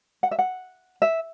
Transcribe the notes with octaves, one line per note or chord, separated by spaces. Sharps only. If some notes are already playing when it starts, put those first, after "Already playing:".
F#5
E5
F#5
E5